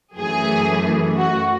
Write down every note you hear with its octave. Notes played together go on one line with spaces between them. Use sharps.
F#2 E3 A3 G#4
F#4